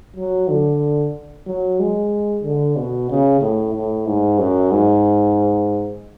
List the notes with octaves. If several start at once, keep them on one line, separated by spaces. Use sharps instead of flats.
F#3
D3
F#3
G#3
D3
B2
C#3
A2
A2
G#2
F#2
G#2